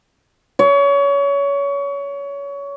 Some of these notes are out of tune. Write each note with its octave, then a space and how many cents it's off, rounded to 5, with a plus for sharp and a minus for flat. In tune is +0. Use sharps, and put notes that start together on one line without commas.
C#5 +25